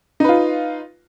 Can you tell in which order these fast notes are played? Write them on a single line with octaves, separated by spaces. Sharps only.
D#4 B4 F4